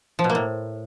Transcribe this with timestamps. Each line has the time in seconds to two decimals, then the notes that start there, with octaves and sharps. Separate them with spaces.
0.19 F3
0.24 B2
0.30 A#3
0.35 A2